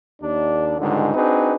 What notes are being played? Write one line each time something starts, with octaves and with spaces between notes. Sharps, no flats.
D#2 D4
C#2 G#2 D3 D#3 G3 G#3
C4 D4 D#4 F#4 G#4 B4